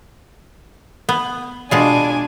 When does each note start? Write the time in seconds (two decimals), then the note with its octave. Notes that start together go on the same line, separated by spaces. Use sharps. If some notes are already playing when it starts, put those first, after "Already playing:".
1.09 B3
1.71 B2 G#3 D4 F4 G#5